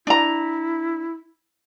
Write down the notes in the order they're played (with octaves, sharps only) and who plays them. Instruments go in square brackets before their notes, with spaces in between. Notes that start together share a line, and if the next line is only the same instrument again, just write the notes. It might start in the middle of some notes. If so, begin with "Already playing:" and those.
[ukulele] D4 A#5 [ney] E4